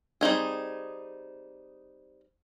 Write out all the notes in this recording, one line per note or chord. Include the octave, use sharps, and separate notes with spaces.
G3 C4 D#4 G#4